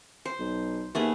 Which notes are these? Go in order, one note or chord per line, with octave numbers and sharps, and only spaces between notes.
C5
B1
D#2 A3 B3 G#4